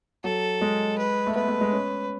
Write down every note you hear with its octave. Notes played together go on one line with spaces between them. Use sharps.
F#3 A4
G#3
B4
A3
B3 B4
A3
G#3
C#4